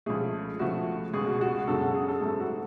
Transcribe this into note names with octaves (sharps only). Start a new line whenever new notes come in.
C#2 C#3 F3 A3 G#4
C#2 C#3 F3 A3 F#4
C#2 B2 G#3 G#4
F#4
F#4
F#4
F#2 C#3 G#3 A4
F#5
G#4
A4
G#2 F#3 A3 A4
F#4